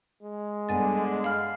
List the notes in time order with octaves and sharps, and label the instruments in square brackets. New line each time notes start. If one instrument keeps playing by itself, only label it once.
[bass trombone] G#3
[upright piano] G2 B3 [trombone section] D3 [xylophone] G#5 A6
[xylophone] F5 B5 F6